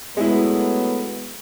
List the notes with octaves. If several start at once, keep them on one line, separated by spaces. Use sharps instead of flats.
F#3 G#3 A3 B3 E4